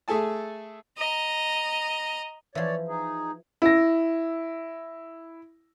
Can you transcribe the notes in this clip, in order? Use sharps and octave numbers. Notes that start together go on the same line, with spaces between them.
A3 G#4 A4 G#5 A5
D#5 A#5
E3 F3 C#5 D5
D#4 G#4
E4 A#6